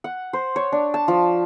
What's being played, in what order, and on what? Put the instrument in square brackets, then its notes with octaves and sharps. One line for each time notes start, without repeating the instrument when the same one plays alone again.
[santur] F#5
C5
C#5
D4
A5
F3